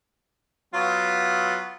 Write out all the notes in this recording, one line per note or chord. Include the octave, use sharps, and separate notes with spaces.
F#3 B3 F4